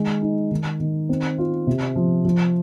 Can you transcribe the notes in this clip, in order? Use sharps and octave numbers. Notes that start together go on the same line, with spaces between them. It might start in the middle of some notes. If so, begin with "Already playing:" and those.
Already playing: D#3 G#3
D#4
D#3
D#3
C4
F4
C3
F3
F3